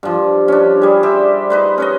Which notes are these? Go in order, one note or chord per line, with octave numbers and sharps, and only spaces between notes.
G2 F3
C#4 D4
G3 G#4
G4 C5 E5
D#4 B4 C5
C#4 B4 D#5